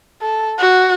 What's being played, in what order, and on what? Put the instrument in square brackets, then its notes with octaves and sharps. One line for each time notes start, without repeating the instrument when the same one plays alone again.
[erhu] A4
F#4